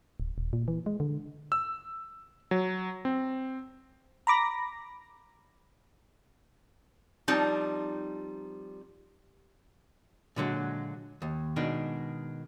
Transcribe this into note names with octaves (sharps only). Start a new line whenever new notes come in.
D1
D#1
A#2
E3
G#3
D3
E6
F#3
C4
A#5 B5 D6 A#6
F3 G3 C4 D#4 A5
A#2 D3 F#3 G#3
D#2
B2 D#3 G#3 D4